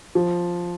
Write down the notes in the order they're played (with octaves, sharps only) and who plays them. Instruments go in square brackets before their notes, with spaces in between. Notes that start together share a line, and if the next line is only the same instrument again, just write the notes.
[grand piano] F3